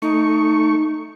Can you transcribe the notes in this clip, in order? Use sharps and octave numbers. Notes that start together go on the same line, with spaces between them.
A3 D#4 C#6